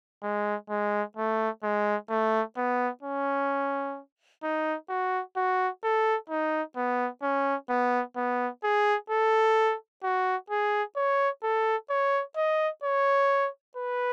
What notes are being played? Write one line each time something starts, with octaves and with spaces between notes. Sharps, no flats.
G#3
G#3
A3
G#3
A3
B3
C#4
D#4
F#4
F#4
A4
D#4
B3
C#4
B3
B3
G#4
A4
F#4
G#4
C#5
A4
C#5
D#5
C#5
B4